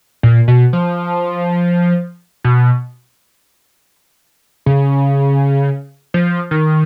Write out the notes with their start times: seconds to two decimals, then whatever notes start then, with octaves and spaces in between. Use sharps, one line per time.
0.23 A#2
0.48 B2
0.73 F3
2.44 B2
4.66 C#3
6.14 F3
6.51 D#3